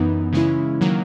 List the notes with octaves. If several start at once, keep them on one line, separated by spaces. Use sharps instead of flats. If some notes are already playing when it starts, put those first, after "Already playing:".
Already playing: F#2 E3 B3 D#4
C#3 E3 G#3 C#4 E4
D#3 F#3 A#3